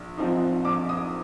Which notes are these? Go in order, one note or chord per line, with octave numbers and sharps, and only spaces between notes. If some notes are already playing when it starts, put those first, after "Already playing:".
Already playing: A#1
G#2 F3 C4 D#4
A#1 D6
D#6